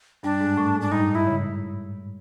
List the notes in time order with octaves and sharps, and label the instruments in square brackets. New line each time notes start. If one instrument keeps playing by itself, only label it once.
[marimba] G2 G3 [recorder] D4
[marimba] G#2 G#3
A2 A3
G#2 G#3
[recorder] D4
[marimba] G2 G3 [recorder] D#4
[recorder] E4
[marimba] C#3